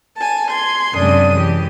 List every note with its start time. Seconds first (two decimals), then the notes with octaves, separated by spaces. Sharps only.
0.17 G#5 A5
0.50 C6 G#6
0.94 F#2 C3 F#3 G#3 D4 D#6
1.34 E3 G4